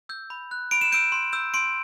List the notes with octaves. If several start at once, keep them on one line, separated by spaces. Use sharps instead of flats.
E6 G6
B5
F#6
B5 D7
E7
E6 G6 D7
C6
E6 G6
C6 D7